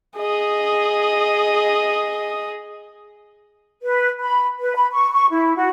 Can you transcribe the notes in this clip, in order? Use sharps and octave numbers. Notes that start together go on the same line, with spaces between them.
G#4 D#5
B4
B5
B4
B5
C#6
C#6
E4
F#4